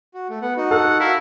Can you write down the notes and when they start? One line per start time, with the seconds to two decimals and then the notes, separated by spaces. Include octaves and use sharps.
0.14 F#4
0.30 A3
0.42 B3 F#5
0.57 D#4 F#4
0.71 A4 F#5
1.00 E4 F#4 A#4 F5